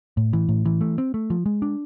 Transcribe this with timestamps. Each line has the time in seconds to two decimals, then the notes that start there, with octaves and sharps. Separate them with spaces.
0.17 A2
0.33 E3
0.49 A2
0.66 E3
0.81 A3
0.98 C4
1.14 A3
1.30 F3
1.46 G#3
1.62 D4